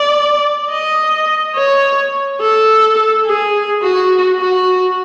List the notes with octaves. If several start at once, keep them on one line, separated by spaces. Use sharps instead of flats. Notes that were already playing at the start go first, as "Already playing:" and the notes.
Already playing: D5
D#5
C#5
A4
G#4
F#4
F#4